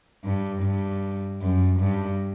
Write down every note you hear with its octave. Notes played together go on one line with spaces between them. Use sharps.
G2
G2
F#2
G2